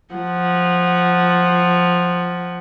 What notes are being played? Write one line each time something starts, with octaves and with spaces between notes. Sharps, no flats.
F3 F#5